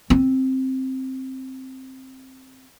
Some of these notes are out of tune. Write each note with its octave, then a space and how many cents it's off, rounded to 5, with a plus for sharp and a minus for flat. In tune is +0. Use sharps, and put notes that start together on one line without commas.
C4 +5